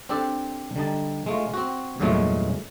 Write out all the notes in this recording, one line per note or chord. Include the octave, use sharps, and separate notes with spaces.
C4 D4 G4 A4
D3 G3 D#4 A5
G#3 A3 F4
C4 F#4
E2 G2 A#2 F#3 G#3 A3